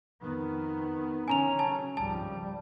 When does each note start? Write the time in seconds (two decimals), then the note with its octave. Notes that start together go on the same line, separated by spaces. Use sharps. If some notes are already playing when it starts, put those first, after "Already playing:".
0.21 F2 D#3 B3
1.28 D3 D#3 C#4 G#5 A#5 F7
1.59 C#3 F#3 A5
1.97 G#1 C#2 F3 G3 A5